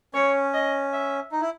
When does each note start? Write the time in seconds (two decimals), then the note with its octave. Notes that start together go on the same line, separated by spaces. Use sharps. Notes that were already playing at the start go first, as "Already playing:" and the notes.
0.14 C#4 C#5
0.54 D#5
0.93 E5
1.32 D#4
1.41 E4